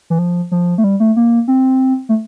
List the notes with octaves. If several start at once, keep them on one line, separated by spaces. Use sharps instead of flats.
E3
F3
F3
A3
G3
A3
A#3
C4
A3